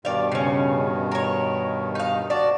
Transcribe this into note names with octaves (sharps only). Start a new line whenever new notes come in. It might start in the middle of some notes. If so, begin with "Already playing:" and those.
G2 B2 D#3 D5 F5
C#3 C#4
A#4 C#5
D#4 F5
F#4 D5 A5